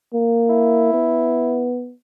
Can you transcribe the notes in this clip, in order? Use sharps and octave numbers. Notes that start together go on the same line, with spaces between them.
A#3
E4
B3